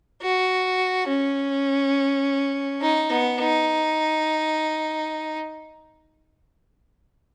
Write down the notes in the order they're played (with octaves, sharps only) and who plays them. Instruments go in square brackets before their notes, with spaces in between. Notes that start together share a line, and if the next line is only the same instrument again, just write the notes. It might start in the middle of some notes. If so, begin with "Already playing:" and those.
[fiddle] F#4
C#4
D#4
B3
D#4